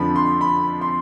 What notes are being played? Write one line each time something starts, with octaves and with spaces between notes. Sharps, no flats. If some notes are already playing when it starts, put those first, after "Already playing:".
Already playing: F2 D3 F3 B5
C6
B5
C6